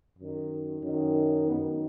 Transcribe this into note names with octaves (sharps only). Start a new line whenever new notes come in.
F#2 D#3
F#2 D#3
F#2 D#3 B3